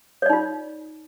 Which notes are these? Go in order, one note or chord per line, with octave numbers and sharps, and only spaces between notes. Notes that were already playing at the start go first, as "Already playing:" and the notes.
D#4 F4 C#5 D5